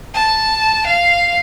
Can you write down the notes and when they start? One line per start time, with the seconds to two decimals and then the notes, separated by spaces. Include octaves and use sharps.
0.14 A5
0.86 F5